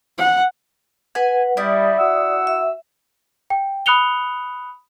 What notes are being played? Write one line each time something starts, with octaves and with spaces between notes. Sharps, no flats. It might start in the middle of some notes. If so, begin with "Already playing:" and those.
F#5
B4 F#5 G#5
G3 E4 D5 D#6
F#4 F#5 E6
E5
G5
B5 D#6 F#6 C#7 F7 G7